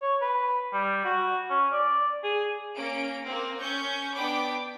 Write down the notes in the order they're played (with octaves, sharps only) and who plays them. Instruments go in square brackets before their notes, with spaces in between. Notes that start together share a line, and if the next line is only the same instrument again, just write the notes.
[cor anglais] C#5
B4
G3
F#4
C#4
D5
G#4
[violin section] A#3 C#4 D7
A#3 C4
C#4 C#6 G6
B3 D4 G5 B5 D6